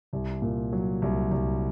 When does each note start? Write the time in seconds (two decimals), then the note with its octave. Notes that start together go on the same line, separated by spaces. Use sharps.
0.13 C2
0.42 A#2
0.73 F#3
1.02 C2
1.31 C2